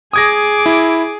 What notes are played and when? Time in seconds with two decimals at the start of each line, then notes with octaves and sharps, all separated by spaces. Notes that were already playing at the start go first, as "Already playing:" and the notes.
0.13 G#4 D6 D#6 G#6 A#6
0.66 E4